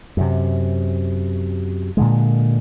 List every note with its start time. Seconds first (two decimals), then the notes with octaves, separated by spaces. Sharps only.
0.17 F#2 C3
1.97 A#2 D3 G#3